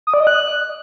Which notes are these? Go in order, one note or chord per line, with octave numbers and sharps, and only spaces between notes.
D#6
D5
D#5
F#6